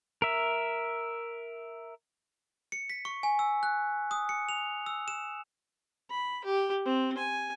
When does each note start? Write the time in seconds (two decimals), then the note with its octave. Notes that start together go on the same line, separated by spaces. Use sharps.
0.22 A#4 E5
2.72 C#7
2.90 B6
3.05 C#6
3.23 G#5
3.39 E6
3.63 F#6
4.11 D#6
4.29 C#7
4.49 F7
4.86 E6
5.08 E7
6.10 B5
6.45 G4
6.85 C4
7.17 G#5